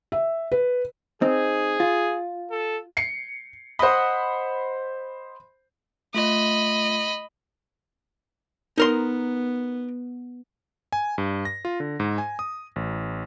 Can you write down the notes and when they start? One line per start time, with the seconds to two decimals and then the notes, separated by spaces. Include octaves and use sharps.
0.12 E5
0.52 B4
1.22 C4 D#4 G#4
1.80 F4
2.51 A4
2.97 C7 C#7
3.79 C5 D#5 F#5 B5
6.14 A3 F4 D#5 B5
8.78 B3 D#4 A#4 C6
10.93 G#5
11.18 G2
11.45 A#6
11.65 F4
11.80 D3
12.00 G#2
12.18 G#5
12.39 D#6
12.76 A1